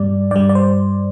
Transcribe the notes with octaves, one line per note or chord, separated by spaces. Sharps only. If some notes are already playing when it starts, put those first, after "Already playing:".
Already playing: G2 G3 D5
G2 G3 D5
D5
C5